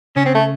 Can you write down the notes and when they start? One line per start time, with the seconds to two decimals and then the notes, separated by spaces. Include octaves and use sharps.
0.16 C#3 C#4
0.25 C4
0.34 A3